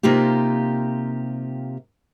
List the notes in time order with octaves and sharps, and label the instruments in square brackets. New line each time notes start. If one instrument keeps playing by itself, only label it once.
[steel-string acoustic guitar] C3 A#3 D#4 F4 G4